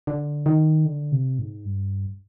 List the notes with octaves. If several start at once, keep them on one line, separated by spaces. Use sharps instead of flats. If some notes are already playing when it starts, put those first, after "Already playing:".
D3
D#3
D3
C3
G#2
G2